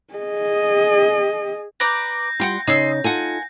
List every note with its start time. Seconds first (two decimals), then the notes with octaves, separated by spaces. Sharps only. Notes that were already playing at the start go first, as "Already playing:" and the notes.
0.14 G#4 D#5
1.80 B4 D5 A#5 G6 A#6
2.40 G3 F4 F#5 G5 C6
2.67 C#3 D#4 G#4 D#5 C6 E6
3.04 D#4 F4 A4 F#5 G#5